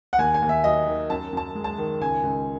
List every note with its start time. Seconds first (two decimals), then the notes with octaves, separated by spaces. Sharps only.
0.13 F#5
0.18 D#2 G#5
0.34 G#5
0.42 D#2
0.49 E5
0.64 F#3 D#5
0.87 D#3
1.10 F#2 A5
1.33 F#2 A5
1.55 G#3
1.64 A5
1.78 D#3
2.01 C#2 G#5
2.23 C#2